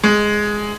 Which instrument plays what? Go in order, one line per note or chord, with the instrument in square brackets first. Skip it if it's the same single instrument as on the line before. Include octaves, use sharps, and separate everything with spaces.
[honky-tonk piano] G#3